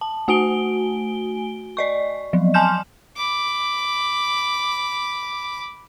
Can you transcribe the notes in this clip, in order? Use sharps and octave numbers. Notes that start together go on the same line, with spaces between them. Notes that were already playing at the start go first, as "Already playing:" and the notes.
A5
A3 F#4 G#5 D7 G7
D5 D#5 C#6
F3 F#3
G#5 A5 C6 F6 G6 E7
B5 D6